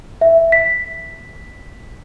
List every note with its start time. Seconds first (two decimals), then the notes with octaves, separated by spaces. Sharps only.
0.21 E5
0.52 B6